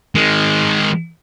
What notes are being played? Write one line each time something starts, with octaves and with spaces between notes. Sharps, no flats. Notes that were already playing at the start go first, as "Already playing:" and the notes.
D#3 G#3